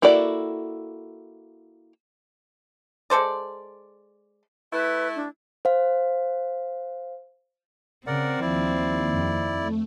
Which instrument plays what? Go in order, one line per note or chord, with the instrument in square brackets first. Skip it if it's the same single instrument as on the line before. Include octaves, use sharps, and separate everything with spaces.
[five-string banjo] A#3 E4 F#4 A4 D5
[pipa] G#3 A4 C5 D5
[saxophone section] A3 E4 [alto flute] B4
[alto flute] D4
[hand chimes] C5 F5
[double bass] C#3 [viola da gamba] C4 [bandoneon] A#4 D5 F#5
[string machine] D#2 [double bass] F3 [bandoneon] E4 D5
[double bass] F2
[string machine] A3